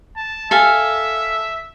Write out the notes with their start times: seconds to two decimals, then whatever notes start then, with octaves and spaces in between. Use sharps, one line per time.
0.17 A5
0.51 A4 E5 F5 G#5